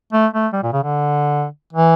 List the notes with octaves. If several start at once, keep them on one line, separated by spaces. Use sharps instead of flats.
A3
A3
G3
A#2
C#3
D3
E3